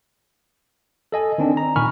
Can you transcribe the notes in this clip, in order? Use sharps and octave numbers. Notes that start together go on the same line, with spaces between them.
A4 D#5 G#5
D#3 C4 D4
A#5
A#2 D#3 G#5 B5 C#6 F6